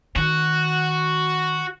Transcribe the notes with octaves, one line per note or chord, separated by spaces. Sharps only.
D#3 F#4